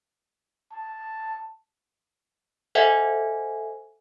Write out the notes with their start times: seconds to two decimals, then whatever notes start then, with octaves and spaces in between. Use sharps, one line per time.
0.72 A5
2.75 A4 C5 D#5 E5 F#5 G#5